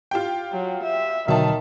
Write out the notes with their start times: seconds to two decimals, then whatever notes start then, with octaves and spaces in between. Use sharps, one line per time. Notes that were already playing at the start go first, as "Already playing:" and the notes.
0.11 F4 G4 G5
0.53 F#3
0.83 E5
1.28 B2 D3 D#3 F#3 E5 A5